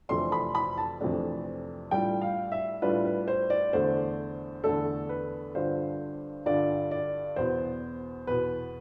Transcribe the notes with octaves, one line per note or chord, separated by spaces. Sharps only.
F2 C3 E3 A3 D4 C6
B5
B5
A5
F2 C3 E3 A3 D4
A2 G3 D4 F4 G5
F5
E5
A2 G3 D4 F4 B4
B4
C5
D5
E2 D3 A3 D4 C5
E2 D3 A3 D4 A4
B4
G2 D3 G3 D4 F4 C5
G2 D3 G3 D4 F4 D5
D5
E2 B2 B3 C5
E2 B2 B3 B4